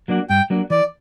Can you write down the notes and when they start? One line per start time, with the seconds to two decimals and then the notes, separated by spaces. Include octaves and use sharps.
0.08 F#3 A#3 D4 F#4
0.29 G2 G5
0.50 F#3 A#3 D4 F#4
0.70 E3 D5